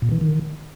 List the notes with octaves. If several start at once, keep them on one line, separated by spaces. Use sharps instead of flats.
A#2
E3
D#3